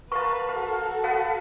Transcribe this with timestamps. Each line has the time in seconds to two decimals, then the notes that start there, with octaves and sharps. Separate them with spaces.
0.11 A#4 B4 F5 A5 A#5 C#6
0.49 F#4 A4 F5
1.04 B4 F5 F#5 A5